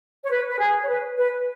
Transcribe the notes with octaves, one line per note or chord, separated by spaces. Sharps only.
C#5
B4
B4
G#4
C#5
B4
B4